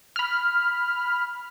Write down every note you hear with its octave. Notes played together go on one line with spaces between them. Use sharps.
B5 F6